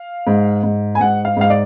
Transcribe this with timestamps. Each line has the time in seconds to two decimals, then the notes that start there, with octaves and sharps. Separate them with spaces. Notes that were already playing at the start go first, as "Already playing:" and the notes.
Already playing: F5
0.27 G#2
0.63 G#2
0.95 G#5
1.00 G#2 F#5
1.25 F5
1.37 G#2 F5
1.50 D5